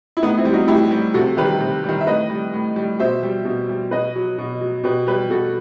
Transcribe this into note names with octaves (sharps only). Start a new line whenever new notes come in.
E4
A2 B3 D#4
C4 E4
G3
D#4 F#4
A2 E4 G4
G3
C3 F#4 A4
D#3 G3 G4 B4
C3
D#3 G3
E5
A2 B4 D#5
G3
A2
G3
B2 C5 E5
G3
B2
G3
B2 B4 D#5
F#3
B2
F#3
B2 G4 B4
G3 G4 B4
B2 F#4 A4